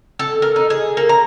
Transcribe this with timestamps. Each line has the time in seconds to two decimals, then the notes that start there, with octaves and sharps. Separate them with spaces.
0.19 A4
0.42 A#4
0.56 D#4
0.70 G#4
0.97 A#3
1.09 A#5